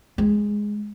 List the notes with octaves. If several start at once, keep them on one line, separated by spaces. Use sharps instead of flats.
G#3